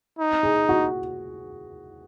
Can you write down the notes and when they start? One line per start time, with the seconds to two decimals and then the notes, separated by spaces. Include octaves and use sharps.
0.19 D#4
0.43 G#4
0.69 F#4